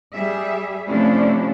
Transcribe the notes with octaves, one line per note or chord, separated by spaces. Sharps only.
G3 G#4 E5
C3 F3 A3 C#4 D4 E4